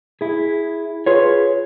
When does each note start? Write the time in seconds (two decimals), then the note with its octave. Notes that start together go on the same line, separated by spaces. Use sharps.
0.21 E4 G#4
1.06 F4 G#4 B4 C#5